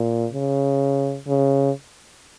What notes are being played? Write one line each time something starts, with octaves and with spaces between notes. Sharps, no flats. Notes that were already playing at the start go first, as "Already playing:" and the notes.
Already playing: A#2
C#3
C#3